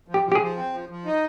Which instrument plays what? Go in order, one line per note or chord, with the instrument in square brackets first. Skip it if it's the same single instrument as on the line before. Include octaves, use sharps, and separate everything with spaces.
[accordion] F3
[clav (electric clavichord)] G4
[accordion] F3
[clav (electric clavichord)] G4
G#4
[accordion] F3
C4
F3
F3
D#4